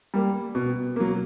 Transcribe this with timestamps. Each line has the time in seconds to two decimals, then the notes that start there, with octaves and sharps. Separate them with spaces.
0.14 G3 A#3
0.55 B2
0.96 F#3 A#3